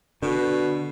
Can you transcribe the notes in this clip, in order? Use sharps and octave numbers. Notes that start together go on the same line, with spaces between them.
B2 D3